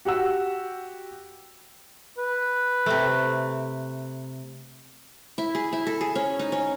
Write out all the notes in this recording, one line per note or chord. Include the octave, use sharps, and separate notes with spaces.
F#4 G4 F#5 E6
B4
C3 A3
E4
G#4
E4
A4
G#4
C#4
D#4
C#4